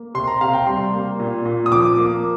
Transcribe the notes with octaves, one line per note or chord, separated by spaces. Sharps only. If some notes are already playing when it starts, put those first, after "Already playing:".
Already playing: A#3
C3 C6
A#5
C3 F5
G5
G3 C6
A#3
A#2
A#2
D#6
F3 D6
A#3